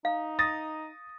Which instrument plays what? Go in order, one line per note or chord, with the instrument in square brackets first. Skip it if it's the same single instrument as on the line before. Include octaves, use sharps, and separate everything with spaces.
[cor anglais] D#4 [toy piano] F5
[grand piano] D#6 A6 A#6